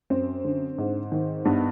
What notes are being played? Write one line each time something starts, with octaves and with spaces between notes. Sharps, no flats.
F#2 C4
D3
G#2
D#3
G2 B3